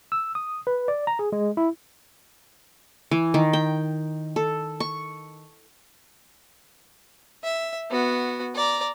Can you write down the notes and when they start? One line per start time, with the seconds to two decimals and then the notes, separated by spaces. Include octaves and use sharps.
0.12 E6
0.35 D#6
0.67 B4
0.88 D5
1.07 A#5
1.19 G#4
1.32 G#3
1.57 E4
3.11 E3
3.34 D#3
3.53 G5
4.36 A4
4.80 C#6
7.44 E5
7.91 B3 F#4
8.55 D5 A#5